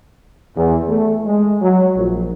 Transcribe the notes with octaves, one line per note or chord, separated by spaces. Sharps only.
E2
A3
G#3
F#3
A#1